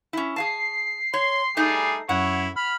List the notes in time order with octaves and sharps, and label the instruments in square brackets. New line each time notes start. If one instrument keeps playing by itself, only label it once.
[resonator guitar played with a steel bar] C#4 E4
[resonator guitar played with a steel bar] G#4 F5 A5 [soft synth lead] C7
[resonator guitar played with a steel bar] C#5 [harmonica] C6
[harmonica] G3 G#4 [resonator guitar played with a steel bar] A3 D#4 D#5
[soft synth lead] F#2 [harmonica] E4 C#5 [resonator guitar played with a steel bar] F#5
[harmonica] B5 [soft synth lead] F6